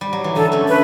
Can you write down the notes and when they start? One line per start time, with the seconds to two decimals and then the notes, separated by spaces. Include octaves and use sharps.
0.01 G3
0.13 F#3
0.24 E3
0.36 D3 A4
0.52 A3 C#4
0.68 B4